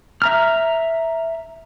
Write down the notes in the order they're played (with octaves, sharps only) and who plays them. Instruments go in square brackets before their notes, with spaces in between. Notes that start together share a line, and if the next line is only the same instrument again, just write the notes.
[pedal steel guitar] E5 A#5 F6